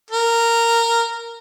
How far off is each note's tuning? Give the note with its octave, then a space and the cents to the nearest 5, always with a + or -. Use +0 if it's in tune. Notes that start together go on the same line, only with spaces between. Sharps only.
A#4 -10